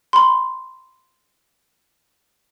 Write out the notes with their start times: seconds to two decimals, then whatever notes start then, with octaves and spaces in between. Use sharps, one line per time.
0.13 B5 C6